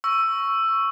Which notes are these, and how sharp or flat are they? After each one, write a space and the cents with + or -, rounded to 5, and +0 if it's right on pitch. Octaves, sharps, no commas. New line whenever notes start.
C#6 +0 E6 +10